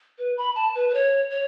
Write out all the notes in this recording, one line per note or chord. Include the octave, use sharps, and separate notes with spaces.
B4
B5
A5
B4
B4
C#5
C#5